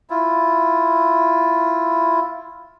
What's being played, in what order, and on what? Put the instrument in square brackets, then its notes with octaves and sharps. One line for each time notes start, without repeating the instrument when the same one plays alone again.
[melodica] E4 F4